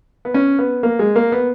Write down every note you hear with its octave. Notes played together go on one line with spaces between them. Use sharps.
B3
C#4
B3
A#3
G#3
A#3
B3